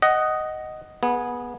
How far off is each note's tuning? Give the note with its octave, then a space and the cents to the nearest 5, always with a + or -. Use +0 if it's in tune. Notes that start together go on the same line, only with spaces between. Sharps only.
D#5 +0 F#5 +15
B3 -20 G#4 +0